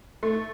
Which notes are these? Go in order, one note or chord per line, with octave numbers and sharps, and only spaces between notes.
A3